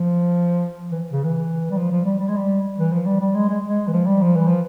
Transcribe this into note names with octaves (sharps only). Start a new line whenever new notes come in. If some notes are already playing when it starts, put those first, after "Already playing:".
Already playing: F3
E3
C#3
E3
G3
F3
F3
G3
G3
G#3
G3
E3
F3
G3
G3
G#3
G#3
G#3
E3
F3
G3
F3
E3
F3